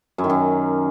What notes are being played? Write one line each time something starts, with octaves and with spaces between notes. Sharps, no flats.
F#2
D#3
F#2